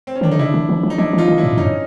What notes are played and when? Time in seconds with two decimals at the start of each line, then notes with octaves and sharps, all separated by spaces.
0.07 C4
0.15 C#4
0.21 D#3 D4
0.30 D3 D#4
0.39 C#3 D4 E4
0.54 D3
0.69 E3
0.83 F3
0.90 D#4
0.98 F3 D4 E4
1.13 E3
1.18 D#4 F4
1.28 D#3
1.38 D4 E4
1.43 A2
1.57 G2 C#4 D#4